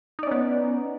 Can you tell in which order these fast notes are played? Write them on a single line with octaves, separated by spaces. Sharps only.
D#4 D5 C#4 B3